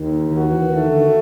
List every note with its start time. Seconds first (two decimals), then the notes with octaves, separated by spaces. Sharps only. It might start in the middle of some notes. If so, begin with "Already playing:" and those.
Already playing: D#2 D#3
0.31 D#3 F#4
0.51 E3
0.70 D#3 A3
0.88 D3